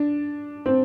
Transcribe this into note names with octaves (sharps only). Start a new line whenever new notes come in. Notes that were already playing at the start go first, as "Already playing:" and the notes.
Already playing: D4
C4